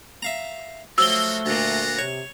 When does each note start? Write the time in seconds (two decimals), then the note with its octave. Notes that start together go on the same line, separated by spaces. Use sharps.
0.22 E5 F5 A#5
0.98 F3 F#3 A3 A#3 F#4 E6 G7
1.46 D2 A#2 F4 F#5 A#5
1.99 C3 C#5